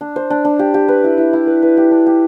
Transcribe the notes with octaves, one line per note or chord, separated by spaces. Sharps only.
D4
C5
D4
D4
G4
G4
B4
E4
E4
E4
B4
B4
G4
D4
G4